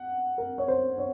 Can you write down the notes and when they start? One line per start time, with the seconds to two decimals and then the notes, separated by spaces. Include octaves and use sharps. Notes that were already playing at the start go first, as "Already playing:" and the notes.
Already playing: F#5
0.38 A#4
0.58 C#5
0.68 C5
0.98 C#5